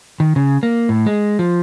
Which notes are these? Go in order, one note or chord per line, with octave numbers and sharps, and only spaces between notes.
D#3
C#3
A#3
A2
G#3
F3